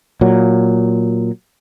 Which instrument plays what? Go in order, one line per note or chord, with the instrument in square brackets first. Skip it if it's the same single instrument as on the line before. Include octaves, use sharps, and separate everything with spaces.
[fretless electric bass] A#2 F#3